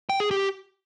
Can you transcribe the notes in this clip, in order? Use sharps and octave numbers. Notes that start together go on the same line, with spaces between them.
G5
G#4
G4